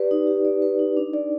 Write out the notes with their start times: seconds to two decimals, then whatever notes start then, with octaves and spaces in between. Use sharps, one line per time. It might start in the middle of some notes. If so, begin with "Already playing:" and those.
Already playing: G4 B4 D5
0.11 D#4
0.27 G4
0.45 D5
0.62 B4
0.79 D#4
0.97 D4
1.14 D5